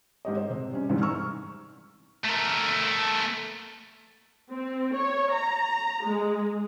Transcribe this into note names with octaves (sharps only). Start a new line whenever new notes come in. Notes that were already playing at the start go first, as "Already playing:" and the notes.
G#2 G4 D#5
C5
C3
G3 C#4
G#2 C3 D#3 E3 G3
A#5 C#6 E6 F6
A3 A#4
C4
C#5
A#5
G#3